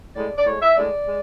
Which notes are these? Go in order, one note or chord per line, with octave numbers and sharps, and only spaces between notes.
A2 G#3 D5
D5
A2 G#3 C#5
E5
A2 G#3 D5
G#3